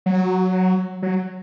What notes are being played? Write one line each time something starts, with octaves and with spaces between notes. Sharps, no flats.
F#3
F#3